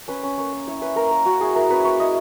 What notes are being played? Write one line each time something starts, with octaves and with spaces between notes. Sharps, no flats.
C#4 B4
C#4
A#3 C#5
A#3
E4 C#5
C#4 B4
A#3 A#4
A#3
C#4 F#4
E4 G#4
E4 A#4
C#4 B4
A#3 C#5
E4 D#5